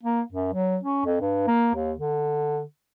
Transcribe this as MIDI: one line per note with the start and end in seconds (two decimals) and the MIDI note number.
0.03 0.21 58
0.32 0.53 42
0.53 0.78 54
0.84 1.05 61
1.05 1.17 41
1.21 1.44 43
1.47 1.72 58
1.75 1.93 39
1.98 2.61 50